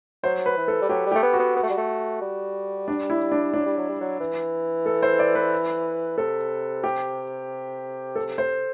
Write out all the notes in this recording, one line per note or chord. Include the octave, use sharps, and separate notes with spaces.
F#3 C5
B4
E3
A4
G3
F#3 G4
G3
G4
A3
B3
F#4
B3
B3
A3
G3
A3
G3
D4
E4
D4
F#3 D4
G3
F#3
G3
F#3
E3
A4
C5
D5
B4
C3 A4
G4
A4
C5